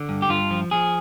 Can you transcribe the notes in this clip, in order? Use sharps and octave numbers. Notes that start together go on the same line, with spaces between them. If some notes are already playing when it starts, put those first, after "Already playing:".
Already playing: D3
G2
G4
G2 F4
F3
F3 G#4